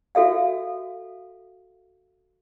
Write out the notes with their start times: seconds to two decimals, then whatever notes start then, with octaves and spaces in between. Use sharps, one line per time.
0.15 F#4 A4 E5 F5